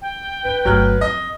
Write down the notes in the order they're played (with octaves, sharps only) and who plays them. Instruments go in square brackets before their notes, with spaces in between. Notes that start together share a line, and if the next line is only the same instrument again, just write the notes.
[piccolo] G5
[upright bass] D4 [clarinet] B4
[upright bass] G1 A3 [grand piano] F#3 F6 F#6
[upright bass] F2 [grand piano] D#5